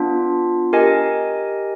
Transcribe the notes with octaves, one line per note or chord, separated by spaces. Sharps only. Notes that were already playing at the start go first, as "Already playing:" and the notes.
Already playing: B3 D4 F4
G4 A#4 D#5 G#5